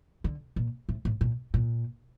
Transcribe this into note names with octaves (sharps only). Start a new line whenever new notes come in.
D3
A#2
A2
A2
A#2
A#2